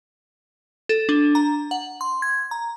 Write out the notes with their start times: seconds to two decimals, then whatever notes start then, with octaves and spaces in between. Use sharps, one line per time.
0.89 A4
1.09 D4
1.35 A#5
1.71 F#5
2.01 C6
2.22 G#6
2.51 A#5